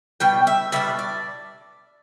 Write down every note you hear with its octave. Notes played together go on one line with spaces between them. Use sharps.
B2 G3 G5
E5
B2 G3 D4 E5
D5